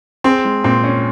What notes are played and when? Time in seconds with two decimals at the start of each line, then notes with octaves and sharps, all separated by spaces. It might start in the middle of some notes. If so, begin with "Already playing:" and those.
0.24 C4 G#4
0.45 G#3
0.64 A#2 C4
0.84 C#4